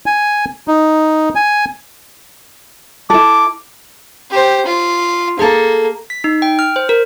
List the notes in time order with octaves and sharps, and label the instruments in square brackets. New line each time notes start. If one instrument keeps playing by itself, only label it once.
[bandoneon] G#5
D#4
G#5
[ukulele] E4 A4 [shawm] D6
[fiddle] G4 C5
F4
[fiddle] A#3 [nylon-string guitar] G#4 A4
[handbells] B6
D#4
G5
F6
C5
A#4